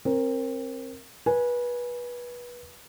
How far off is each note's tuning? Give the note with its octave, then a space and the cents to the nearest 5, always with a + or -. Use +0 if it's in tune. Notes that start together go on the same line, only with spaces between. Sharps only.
C4 +25 A#4 +0
B4 -25 G#5 +0